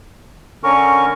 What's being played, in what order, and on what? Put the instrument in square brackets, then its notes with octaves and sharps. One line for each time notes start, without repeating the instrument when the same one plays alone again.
[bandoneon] D3 C#4 A#4 [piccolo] C#6